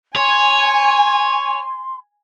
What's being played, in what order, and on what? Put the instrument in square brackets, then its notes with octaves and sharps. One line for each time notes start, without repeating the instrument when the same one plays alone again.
[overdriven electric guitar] C#5 [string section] G#5 [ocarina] C6